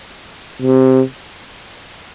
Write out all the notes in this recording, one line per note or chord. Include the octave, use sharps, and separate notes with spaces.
C3